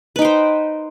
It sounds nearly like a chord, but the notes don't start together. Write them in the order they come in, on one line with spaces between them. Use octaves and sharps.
B4 D#4 G5 C5